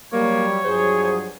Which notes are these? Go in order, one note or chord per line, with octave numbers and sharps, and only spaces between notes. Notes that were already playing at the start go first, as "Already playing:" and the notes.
F#3 G3 A#3 C#5
G2 F3 F#3 G#4 C5